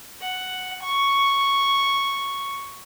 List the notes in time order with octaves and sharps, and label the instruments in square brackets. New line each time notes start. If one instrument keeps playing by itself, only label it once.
[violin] F#5
C#6